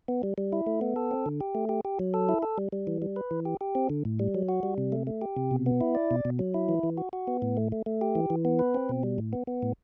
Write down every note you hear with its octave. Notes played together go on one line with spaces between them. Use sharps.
B3
G3
G3
E4
A3
B3
A4
C4
D3
G4
A3
G4
G4
F#3
A4
E4
A4
G3
G3
E3
G3
B4
E3
G4
G4
C4
D3
A2
G3
F#3
F#4
G3
C3
A3
A3
G4
C3
B2
B3
E4
D5
B2
B2
F#3
E4
E3
E3
F#4
F#4
B3
A2
A3
A3
A3
G4
E3
E3
B3
B4
C4
B2
G3
A2
B3
B3
A2